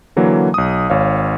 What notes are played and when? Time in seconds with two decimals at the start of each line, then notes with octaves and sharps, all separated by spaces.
0.16 D3 E3 F#3 A#3
0.54 B1 D#6
0.90 G#1 C#5 F5